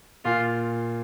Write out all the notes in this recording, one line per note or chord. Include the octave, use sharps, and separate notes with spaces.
A#2 F4